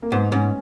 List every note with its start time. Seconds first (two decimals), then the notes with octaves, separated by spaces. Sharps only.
0.02 A#3
0.12 G#2 B3
0.32 G#2 C#4